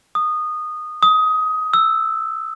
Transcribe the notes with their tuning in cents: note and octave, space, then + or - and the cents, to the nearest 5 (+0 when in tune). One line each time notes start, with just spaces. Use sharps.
D#6 -15
D#6 +20
E6 +0